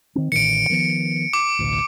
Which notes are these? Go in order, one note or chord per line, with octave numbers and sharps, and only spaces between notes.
D#3 C4
A1 D3 D#3 C#7 D7
D#3 F3 B3
D6
A1 D2 B2